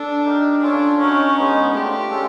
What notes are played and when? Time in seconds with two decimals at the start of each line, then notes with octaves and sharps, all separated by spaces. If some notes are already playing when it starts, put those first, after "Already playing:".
Already playing: D4 A4
0.25 D#4 G4 A#4
0.62 C#4 D4 F4 A4 C#5
0.99 C#4 D#4 F#4 A#4 C#5
1.37 G#3 B3 D#4
1.74 A3 D4 F4 G4
2.11 G#3 C#4 F4 A4